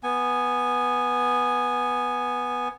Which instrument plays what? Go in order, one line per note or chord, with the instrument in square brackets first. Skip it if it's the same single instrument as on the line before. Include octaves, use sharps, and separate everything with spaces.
[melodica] B3 G#5